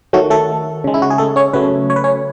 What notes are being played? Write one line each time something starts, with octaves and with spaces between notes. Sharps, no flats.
D#3 F#3 A3 F#4
A3 A4
C#3 G#3
E4
F#4
G#4
A3 A4
C#4 C#5
C#3 F#3 A3 B3 B4
C#5
B4
C#4 C#5